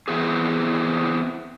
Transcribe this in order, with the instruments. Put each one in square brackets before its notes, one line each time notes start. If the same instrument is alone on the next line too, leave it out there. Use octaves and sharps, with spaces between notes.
[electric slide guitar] E3 B3 C4 G#4